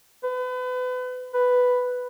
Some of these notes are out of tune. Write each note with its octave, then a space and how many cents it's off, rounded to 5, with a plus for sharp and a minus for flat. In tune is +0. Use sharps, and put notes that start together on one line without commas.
B4 +35
B4 +5